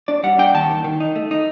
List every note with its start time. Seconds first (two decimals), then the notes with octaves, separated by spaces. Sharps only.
0.08 D4 D5
0.23 G3 F#5
0.38 D4 G5
0.54 D#2 A5
0.69 D#3
0.84 D#3
1.00 D#4
1.16 A3
1.31 D#4